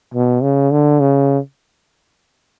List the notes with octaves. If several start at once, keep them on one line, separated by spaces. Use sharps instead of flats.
B2
C#3
D3
C#3